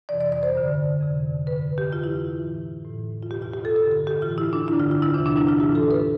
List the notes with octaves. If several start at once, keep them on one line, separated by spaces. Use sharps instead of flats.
F2 C3 E3 D5
D5
D5
C5
G2 D3
F2 C3 E3
G2 D3 B4
G4
F2 E3 F4
E4
E4
A2 E3
A2 E3
F4
E2 B2 G4
F4
G4
A4
G2 D3 A4
A4
G4
A2 E3 F4
E4
D4
G2 D3 E4
F4
F4
E4
E2 C3 E3 D4
D4
E4
F4
A2 E3 G4
A4
B4